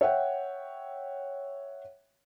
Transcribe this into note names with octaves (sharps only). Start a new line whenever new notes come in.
C#5 E5 F#5 G5